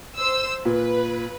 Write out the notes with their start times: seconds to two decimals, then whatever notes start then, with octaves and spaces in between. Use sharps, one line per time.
0.17 C5 E6
0.65 A#2 B4